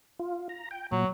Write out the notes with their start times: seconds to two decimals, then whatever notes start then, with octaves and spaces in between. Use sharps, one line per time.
0.19 F4
0.49 A#5
0.71 G5
0.92 A#2 F#3